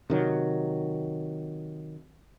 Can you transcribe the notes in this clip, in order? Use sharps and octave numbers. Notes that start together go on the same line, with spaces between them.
C3 D#3 F#3